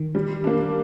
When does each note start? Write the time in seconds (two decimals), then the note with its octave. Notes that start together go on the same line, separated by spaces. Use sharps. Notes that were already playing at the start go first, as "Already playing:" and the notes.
Already playing: D#3
0.15 G3
0.44 A#3 D4